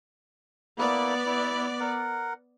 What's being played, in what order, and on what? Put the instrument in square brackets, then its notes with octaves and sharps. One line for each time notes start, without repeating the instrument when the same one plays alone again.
[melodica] A#3 E4 [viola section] B3 D5
[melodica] E4
A#4 F#5